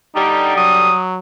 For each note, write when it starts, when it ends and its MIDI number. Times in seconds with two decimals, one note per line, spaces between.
0.15 0.89 50
0.15 0.89 55
0.15 0.52 63
0.57 1.19 54
0.57 0.98 87